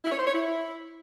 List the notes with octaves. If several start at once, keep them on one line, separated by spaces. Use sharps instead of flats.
E4
C#5
C5
C#5
E4